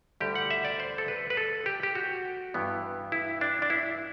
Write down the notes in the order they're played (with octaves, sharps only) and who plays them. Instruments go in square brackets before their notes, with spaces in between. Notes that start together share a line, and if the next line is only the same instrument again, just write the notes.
[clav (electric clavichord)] D2 D3 G3 G4
F#5
E5
D5
C5
A4
B4
B4
A4
G4
G4
F#4
G2 E3 B3
E4
D4
D4
E4